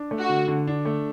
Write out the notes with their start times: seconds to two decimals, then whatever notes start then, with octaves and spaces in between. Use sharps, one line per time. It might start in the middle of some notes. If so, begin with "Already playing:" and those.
Already playing: D4
0.11 A3
0.20 F#4
0.29 D3
0.48 D3
0.67 D4
0.86 A3